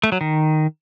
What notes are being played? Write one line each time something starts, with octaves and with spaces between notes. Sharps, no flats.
A3
F#3
D#3